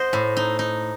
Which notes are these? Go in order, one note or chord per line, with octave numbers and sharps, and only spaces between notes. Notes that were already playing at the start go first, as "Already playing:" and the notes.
Already playing: C5 D#5 F#5
A2
D#4
D#4